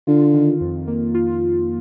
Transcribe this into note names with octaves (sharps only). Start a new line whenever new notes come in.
D3 F4
D#3
F2
A#3
F4